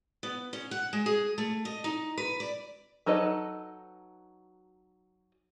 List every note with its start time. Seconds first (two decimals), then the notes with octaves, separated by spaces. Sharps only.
0.23 B3
0.53 C#4
0.71 F#5
0.93 G#3
1.06 G#4
1.38 A3
1.65 D#5
1.84 D#4
2.18 B4
2.40 D5
3.06 F#3 D#4 A4 B4 D#5